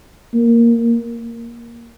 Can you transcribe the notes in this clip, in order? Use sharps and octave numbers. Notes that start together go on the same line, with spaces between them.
A#3